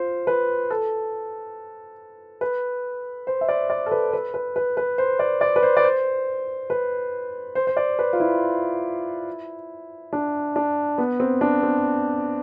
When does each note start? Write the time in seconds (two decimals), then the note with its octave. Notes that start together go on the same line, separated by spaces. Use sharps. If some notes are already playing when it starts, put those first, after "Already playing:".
Already playing: F4 C5
0.27 B4
0.70 A4
2.41 B4
3.27 C5
3.41 E5
3.48 D5
3.70 D5
3.86 A4
3.91 B4
4.13 B4
4.34 B4
4.56 B4
4.77 B4
4.98 C5
5.19 D5
5.41 D5
5.56 B4
5.63 C5
5.77 D5
5.84 C5
6.70 B4
7.55 C5
7.67 C5
7.77 D5
7.99 B4
8.13 F4
8.20 E4
10.13 D4
10.56 D4
10.98 B3
11.20 C4
11.41 D4
11.63 C4